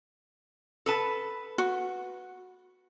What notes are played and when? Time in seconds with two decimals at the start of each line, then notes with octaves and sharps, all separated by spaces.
0.86 A4 B4 A5
1.58 F#4